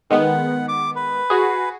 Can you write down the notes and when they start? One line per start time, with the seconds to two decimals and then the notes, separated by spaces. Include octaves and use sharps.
0.11 D#3 G#3 B3 F#5
0.68 D6
0.96 B4
1.30 F#4 G#4